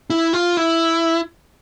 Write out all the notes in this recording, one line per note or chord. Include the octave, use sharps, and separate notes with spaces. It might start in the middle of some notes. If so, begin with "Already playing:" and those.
E4
F4
E4